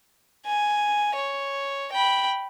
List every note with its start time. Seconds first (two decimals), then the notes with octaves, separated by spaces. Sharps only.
0.46 G#5
1.15 C#5
1.92 G5 B5